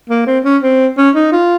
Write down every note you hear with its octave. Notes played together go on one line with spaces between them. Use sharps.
A#3
C4
C#4
C4
C#4
D#4
F4